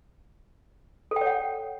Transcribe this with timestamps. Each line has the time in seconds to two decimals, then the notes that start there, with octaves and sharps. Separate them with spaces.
1.11 A4
1.16 G5
1.21 C#5
1.26 F#5